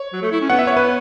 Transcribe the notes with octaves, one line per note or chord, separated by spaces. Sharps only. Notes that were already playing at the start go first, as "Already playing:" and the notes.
Already playing: C#5
F#3
A3
E4
C#4
B3 F#5
E5
C#5
B4